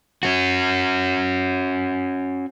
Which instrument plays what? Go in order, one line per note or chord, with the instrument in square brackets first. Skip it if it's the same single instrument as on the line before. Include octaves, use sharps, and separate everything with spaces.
[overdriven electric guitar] C#4 F#4